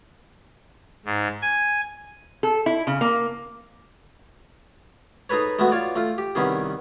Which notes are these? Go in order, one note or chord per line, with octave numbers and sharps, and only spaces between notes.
G#2
G#5
A4
E4
C#3
A#3
D#4 G#4 A4 B4 C#5
G#3 A3 B3 F#4
F4 C#5 D5
A3 F4
G4
C2 D#3 B3 C#4 G#4